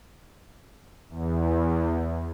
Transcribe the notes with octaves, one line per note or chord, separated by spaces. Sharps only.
E2